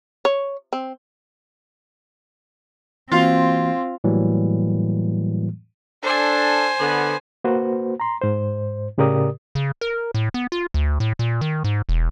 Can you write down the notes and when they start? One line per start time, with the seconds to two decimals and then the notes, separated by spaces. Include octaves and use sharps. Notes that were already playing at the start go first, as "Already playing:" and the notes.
0.25 C#5
0.73 C4
3.12 E3 A#3 C4 F4 F#4 F5
4.04 A2 E3 F#3 G3 A#3
6.03 D4 A4 C5 G#5
6.80 D3 B3
7.44 A#3 F#4 B4 C5
8.00 A#5 C6
8.22 G#2 C5
8.98 A2 C#3 G4 A#4 D5 D#6
9.55 C#3
9.81 A#4
10.14 A2
10.34 B3
10.52 F4
10.74 D2
11.00 A2
11.19 A#2
11.41 D#3
11.64 G#2
11.89 E1